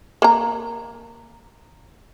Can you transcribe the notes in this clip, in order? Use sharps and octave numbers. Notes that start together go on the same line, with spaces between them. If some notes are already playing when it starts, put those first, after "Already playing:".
A#3 A#5